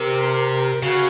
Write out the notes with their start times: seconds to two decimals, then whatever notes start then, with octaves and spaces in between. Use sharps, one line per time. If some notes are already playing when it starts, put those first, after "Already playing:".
Already playing: C3 A#4
0.82 C#3 F#4